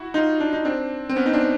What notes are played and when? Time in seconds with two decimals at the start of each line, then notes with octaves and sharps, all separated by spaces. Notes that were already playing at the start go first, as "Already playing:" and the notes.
Already playing: E4 F#4
0.14 D#4 F4
0.40 D4
0.53 D#4
0.65 C4 D4
1.09 C4
1.16 B3 C#4
1.26 D#4
1.33 C4 D4